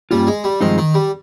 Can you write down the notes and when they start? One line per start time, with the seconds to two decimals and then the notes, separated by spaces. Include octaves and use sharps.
0.11 G2 D#3 G3 A#3 C#4 F4
0.27 G#3
0.44 G3
0.61 G2 D#3 F3 G#3 C4 D#4
0.78 D#3
0.94 G3